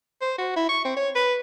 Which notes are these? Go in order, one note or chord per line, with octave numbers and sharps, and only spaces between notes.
C5
F#4
E4
C#6
C4
C#5
B4